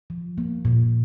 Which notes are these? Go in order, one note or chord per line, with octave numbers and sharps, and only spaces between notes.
F3
A#3
A#2